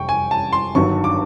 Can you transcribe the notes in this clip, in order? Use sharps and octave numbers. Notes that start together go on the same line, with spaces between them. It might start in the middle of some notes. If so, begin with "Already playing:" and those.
Already playing: F1 G5 C#6
G#5
A5
C6
G1 G2 D#3 F#3 C#6
D6